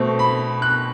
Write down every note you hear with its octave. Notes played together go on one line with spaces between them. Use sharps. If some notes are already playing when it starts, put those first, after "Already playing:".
Already playing: B2 A3 C4
B5
F#6